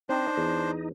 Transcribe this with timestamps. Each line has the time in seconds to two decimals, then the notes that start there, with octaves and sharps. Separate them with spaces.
0.09 C4 D4 D#4 C5
0.38 E2